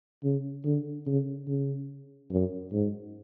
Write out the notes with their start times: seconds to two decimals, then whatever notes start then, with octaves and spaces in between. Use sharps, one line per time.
0.23 C#3
0.65 D3
1.06 C#3
1.47 C#3
2.31 F#2
2.72 G#2